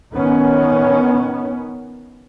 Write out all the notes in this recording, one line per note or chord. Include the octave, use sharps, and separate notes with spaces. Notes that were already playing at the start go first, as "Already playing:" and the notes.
D#3 B3 C#4